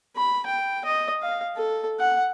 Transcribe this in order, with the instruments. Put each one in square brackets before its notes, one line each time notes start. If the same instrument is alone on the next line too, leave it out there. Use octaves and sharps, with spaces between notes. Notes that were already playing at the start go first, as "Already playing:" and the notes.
[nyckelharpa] B5
G5
D#5
F5
A4
F#5